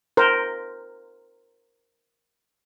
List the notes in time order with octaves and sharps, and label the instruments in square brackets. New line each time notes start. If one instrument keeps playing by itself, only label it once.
[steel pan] A#4 C5